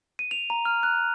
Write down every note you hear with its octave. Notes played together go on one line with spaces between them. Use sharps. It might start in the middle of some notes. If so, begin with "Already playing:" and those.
D#7
F7
A#5
F6
F#6